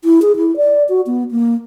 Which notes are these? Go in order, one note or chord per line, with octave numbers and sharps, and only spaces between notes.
E4
G#4
E4
D5
F#4
B3
A#3